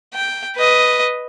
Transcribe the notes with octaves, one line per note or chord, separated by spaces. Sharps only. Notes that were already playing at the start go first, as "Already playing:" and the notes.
G5
B4 D#5